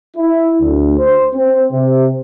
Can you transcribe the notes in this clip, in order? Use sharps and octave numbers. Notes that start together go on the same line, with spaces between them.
E4
D2
C5
C4
C3